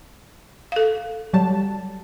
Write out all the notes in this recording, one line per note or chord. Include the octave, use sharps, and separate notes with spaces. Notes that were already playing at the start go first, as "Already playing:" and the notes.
A4 F5
F#3 G3 A5